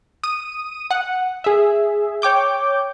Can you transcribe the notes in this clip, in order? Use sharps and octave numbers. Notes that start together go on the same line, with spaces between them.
D#6 D#7
F#5
G#4 E5
C#5 G5 D6 G6